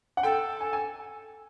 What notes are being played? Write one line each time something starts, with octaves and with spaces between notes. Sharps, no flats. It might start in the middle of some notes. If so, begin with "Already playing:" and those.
F#5
A4 G5
G#5
G#5